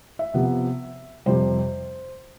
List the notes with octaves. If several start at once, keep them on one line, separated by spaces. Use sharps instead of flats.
E5
C3 F3 B3
F2 C3 G3 C5